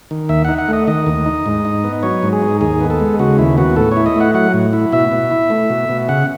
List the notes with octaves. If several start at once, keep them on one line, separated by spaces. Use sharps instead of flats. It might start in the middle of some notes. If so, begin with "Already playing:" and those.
D#3
D#2 E5
D#4 F#5
F#5
A3
D#5
D#3 D#5
D#2
D#4
G#2
D#4
B3
F#3 C#5
G#2
G#4
D#4
D#2 G#4
B3
A4
G#3
C#3 F#4
D#2 E4
B3 F#4
A2 A4
C#5
E4
D#5
A3 F#5
F#3 F#5
A2
E4
B2 E5
B2
E4
A3
B2
B2
C#3 F#5